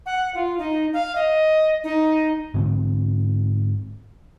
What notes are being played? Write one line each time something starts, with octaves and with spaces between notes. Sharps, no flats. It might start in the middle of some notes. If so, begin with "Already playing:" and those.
F#5
F4
D#4
F5
D#5
D#4
G#2 D3 C4